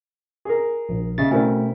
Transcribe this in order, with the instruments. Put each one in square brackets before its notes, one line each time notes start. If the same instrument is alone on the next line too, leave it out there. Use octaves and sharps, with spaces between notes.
[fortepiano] G#4 A#4
[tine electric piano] A#1
[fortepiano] C#3 [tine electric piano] D#5 E5 A6
[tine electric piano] B2 A3 C4 [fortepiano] C#4 E4 A#4